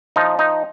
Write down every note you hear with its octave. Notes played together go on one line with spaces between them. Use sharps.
F3 D#4
D#4